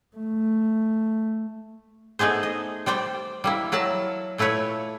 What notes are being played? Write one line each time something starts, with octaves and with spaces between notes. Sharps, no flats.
A3
A3 B3 D#4 G#4 C5
D#5
G3 C5 D5 G5
G3 A#3 E4
F#3 E4 A#4 A5
A#2 A3 E4 B4 C#5